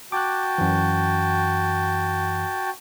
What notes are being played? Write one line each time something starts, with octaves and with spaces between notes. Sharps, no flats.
F#4 G5 A5 D6 F#6
F#2 E3